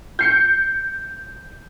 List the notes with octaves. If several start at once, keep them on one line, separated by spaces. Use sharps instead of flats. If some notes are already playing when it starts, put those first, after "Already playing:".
G6 C7 C#7